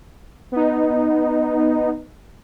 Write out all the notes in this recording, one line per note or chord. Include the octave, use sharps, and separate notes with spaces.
B3 D#4